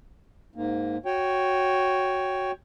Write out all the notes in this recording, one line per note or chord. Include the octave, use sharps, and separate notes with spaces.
G#2 A#3
F#4 C#5 G5